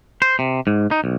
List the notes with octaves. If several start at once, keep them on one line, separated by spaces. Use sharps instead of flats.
C5
C3
G#2
D#4
B1